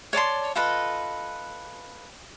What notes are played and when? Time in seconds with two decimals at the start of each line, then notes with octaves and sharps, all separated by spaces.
0.13 C#5 D5 A5 C6
0.55 F4 A4 B4 D#5